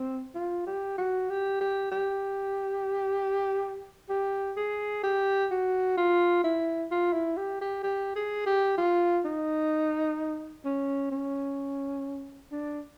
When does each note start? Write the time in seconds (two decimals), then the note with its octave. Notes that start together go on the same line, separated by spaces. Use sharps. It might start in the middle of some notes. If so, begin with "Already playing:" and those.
Already playing: C4
0.35 F4
0.67 G4
0.98 F#4
1.29 G4
1.61 G4
1.91 G4
4.09 G4
4.57 G#4
5.03 G4
5.51 F#4
5.97 F4
6.44 E4
6.91 F4
7.13 E4
7.37 G4
7.61 G4
7.83 G4
8.16 G#4
8.46 G4
8.78 F4
9.25 D#4
10.65 C#4
11.11 C#4
12.52 D4